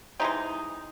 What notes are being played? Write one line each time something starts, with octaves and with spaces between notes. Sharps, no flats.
C3 E3 G#3 D#4